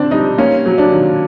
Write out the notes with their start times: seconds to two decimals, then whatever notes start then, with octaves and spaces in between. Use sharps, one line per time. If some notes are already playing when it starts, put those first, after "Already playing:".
Already playing: D3 C4 D4
0.11 G3 D#4
0.38 A#3 C#4
0.66 F#3
0.78 D4
0.92 D#3